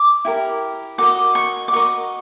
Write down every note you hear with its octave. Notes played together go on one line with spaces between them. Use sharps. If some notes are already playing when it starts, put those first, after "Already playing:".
Already playing: D6
E4 G4 A#4
F#4 A#4 D#5 D6
C#6
D6
F#4 A#4 D#5 C#6